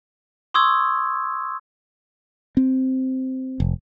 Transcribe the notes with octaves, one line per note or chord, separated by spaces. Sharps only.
C6 C#6 D#6 E6 G#6
C4
F1